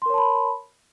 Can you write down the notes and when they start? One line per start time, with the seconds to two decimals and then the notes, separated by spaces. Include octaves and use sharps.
0.02 C6
0.06 A#4
0.10 C#5
0.14 A5
0.18 B5